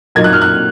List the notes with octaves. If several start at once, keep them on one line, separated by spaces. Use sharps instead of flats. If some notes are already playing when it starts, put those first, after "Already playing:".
A#2 F#3 A#3 D#4 G#6
F#6
F6
F#6